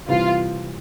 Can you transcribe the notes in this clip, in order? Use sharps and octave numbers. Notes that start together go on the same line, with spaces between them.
C3 E3 G3 F4